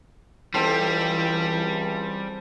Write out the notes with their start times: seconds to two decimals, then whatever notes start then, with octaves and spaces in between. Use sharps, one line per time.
0.54 C#2 E3 G3 C4 A4 C5